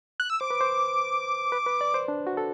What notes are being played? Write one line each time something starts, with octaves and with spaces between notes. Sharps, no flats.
F#6
E6
C5 D6
B4
C5
B4
B4
D5
C5
D4
F#4
A4